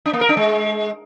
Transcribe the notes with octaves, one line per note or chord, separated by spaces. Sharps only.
D4
A#3
A#4
D4
G#3